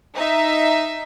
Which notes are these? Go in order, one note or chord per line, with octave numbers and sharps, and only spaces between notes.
D#4 E5